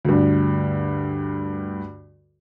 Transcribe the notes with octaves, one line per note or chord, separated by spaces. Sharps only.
D2 G2